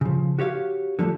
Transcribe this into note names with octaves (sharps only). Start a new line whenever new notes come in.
C#3 F3
F#4 G4 C#5 F5
D3 F3 F#3 A3